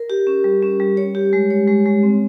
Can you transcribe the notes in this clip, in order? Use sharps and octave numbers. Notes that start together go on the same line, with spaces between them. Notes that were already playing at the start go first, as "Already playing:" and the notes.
Already playing: A#4
G4
C#4
G3
C#4
G3
C#5
G4
G#3
C#5
G#3
G#3
C4